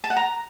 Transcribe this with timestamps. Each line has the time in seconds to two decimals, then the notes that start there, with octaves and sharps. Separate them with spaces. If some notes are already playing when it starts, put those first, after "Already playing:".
0.04 A5
0.10 F#5
0.17 A#5